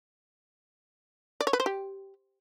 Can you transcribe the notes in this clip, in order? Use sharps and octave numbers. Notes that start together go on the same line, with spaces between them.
D5
C#5
B4
C5
G4